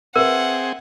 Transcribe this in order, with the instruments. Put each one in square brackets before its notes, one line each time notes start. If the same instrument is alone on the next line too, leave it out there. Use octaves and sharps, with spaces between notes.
[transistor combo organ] C4 G#4 [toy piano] A#4 [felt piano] B4 E5 [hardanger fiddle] F#5